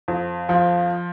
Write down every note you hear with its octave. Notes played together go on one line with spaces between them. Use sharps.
F2
F3